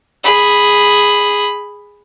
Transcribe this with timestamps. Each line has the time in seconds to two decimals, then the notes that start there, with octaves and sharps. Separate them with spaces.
0.24 G#4 B5